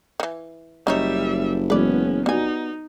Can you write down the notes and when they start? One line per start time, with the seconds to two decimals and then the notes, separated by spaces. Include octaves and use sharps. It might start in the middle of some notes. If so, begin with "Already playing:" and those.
0.20 D#3 E3
0.87 F#1 G3 C#4 D#4 C#5 E5
1.70 E3 F#3 G#3 B3 C#4 B4 D5
2.26 G3 B3 D#4 F#4 G#5